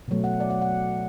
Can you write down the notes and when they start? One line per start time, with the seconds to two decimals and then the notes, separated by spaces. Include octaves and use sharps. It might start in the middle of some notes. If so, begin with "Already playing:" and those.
0.08 B2 F#3 A3
0.24 F#5
0.40 D5
0.50 F#5
0.62 F#5